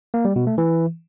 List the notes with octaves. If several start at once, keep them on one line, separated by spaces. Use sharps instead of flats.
A#3
G3
B2
A3
E3